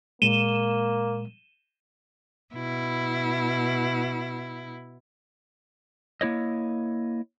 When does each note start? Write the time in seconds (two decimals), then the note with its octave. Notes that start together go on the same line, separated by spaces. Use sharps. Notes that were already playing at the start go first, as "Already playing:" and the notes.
0.22 A#2 G#3 A#3 D#7 E7 G7
2.54 B2 E4
6.21 A#3 E4 C#5 D#5